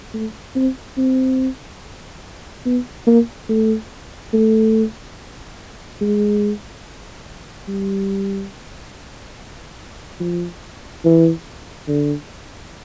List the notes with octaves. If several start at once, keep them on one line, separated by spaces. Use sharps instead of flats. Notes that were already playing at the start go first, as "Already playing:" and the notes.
A3
C4
C4
B3
A#3
A3
A3
G#3
G3
F3
E3
D3